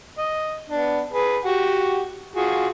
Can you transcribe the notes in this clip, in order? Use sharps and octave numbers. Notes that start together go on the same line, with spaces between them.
D#5
B3 D4
G#4 B4
F#4 G4 F#5
F4 F#4 G#4